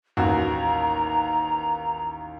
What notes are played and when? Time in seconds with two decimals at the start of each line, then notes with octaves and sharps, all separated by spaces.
0.17 A1 D#2 F#4 A#5